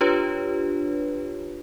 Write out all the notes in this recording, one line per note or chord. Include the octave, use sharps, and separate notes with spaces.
D4 F4 G4 B4 C#5